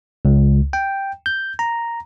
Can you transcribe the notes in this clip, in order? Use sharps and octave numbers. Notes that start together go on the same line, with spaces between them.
C#2
G5
G6
A#5